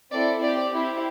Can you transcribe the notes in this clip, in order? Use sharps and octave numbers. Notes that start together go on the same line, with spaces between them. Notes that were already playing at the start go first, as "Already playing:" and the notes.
C4 E4 A4 D5
C4 G4 D5
C4 E4 G4